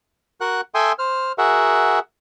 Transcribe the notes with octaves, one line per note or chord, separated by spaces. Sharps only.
F#4 A#4 F#5 F#6
A4 E5 G5 G#5 C6 D#6
C5 F6
F#4 G#4 A#4 E5 F#5